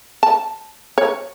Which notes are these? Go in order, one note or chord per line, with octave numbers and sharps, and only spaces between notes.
A5
C#5